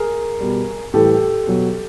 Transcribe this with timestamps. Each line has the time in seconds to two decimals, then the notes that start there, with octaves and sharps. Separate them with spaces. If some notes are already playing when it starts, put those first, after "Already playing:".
Already playing: G#4 A#4
0.40 B2 G3
0.94 A2 E3 G3 G4 A4
1.47 B2 F#3